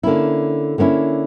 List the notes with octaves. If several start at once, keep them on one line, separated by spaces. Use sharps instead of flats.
D3 A#3 C#4 E4
D3 A#3 C#4 E4